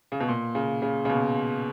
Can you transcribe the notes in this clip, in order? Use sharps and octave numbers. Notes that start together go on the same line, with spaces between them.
C#3
B2
A#2
C#3
C#3
C#3
B2